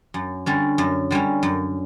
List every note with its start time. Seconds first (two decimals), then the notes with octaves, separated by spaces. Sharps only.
0.14 F#2
0.46 D3 G3 C#4
0.78 F#2
1.11 D3 G3 C#4
1.43 F#2